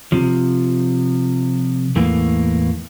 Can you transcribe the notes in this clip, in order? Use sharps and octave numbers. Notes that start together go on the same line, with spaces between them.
C3 F3
E2 A2 E3 A3 A#3